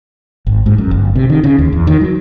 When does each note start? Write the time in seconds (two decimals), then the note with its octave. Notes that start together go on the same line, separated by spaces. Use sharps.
0.47 G#1
0.66 G#2
0.78 F#2
0.91 G1
1.15 C3
1.30 D#3
1.44 C#3
1.59 D#2
1.73 E2
1.87 D#3
2.01 F#3